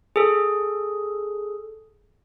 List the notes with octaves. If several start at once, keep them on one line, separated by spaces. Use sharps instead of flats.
G#4 A4